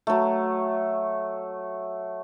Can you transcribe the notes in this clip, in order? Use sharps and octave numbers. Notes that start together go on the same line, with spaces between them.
F#3 A3